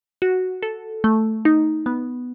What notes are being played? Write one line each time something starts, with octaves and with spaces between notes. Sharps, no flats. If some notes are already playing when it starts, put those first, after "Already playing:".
F#4
A4
A3
D#4
B3